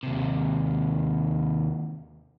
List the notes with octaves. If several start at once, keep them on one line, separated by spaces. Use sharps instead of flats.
D#2 C3